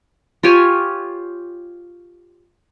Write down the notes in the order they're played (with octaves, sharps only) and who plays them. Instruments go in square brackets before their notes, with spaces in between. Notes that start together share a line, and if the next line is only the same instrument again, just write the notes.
[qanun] F4 G4 C#5 G#5